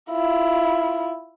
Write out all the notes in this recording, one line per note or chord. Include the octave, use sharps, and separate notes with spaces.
E4 F4